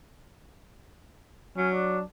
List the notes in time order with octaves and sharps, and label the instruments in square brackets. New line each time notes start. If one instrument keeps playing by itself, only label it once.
[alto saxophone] F#3 [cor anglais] C#4
[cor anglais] D4